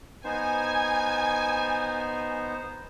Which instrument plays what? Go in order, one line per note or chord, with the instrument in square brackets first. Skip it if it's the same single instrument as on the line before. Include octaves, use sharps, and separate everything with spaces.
[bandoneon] B3 D#4 C5 [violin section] G#5